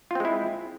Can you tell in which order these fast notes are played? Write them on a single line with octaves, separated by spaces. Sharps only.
F4 C4 G#3 E4